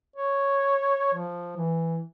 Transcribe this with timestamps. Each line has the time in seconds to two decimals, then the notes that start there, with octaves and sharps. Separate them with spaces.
0.16 C#5
1.15 F3
1.57 E3